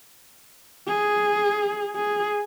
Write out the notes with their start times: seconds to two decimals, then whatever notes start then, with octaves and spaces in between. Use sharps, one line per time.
0.88 G#4
1.96 G#4